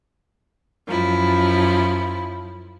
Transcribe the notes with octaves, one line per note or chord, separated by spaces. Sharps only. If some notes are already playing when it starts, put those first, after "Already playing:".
F#2 F3 E4